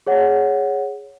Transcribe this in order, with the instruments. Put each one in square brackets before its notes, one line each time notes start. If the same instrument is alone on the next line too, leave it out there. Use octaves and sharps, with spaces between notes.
[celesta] G#4 C#5 F#5